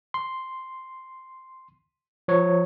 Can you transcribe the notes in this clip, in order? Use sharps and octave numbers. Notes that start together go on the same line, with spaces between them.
C6
F3 C#5